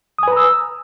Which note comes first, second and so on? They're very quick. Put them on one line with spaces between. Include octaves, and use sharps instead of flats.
D#6 G#5 B4 A#5 E6